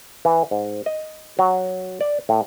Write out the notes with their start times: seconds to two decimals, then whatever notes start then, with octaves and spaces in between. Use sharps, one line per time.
0.25 E3
0.51 G#2
0.86 D#5
1.39 F#3
2.01 D5
2.29 A2